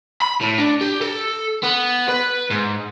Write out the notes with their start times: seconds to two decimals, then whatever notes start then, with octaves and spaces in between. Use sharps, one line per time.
0.22 B5
0.41 A2
0.58 D4
0.81 G4
1.01 A4
1.64 B3
2.09 B4
2.51 G#2